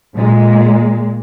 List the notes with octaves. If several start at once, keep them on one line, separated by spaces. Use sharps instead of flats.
A#2 G#3